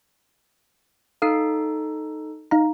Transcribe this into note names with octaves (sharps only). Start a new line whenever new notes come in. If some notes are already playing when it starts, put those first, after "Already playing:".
D#4 A4 F5 D#6 C7
D#4 F5 A#5